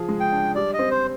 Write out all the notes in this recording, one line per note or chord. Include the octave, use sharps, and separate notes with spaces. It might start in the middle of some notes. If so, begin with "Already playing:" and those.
Already playing: F3 G#4
G#3
G5
D4
G3 D5
D#5
C4
C5